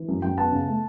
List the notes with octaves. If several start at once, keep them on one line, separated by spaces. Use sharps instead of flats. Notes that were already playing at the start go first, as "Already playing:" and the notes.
Already playing: E3
F#2
F#2 G5
B3 F#5 A5
C#3
A3